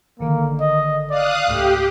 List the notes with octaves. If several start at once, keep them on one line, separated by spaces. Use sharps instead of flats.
G#1 D3 D#3 A#3
D#5
D5 F5 D#6 F#6
C#2 G#2 A3 G4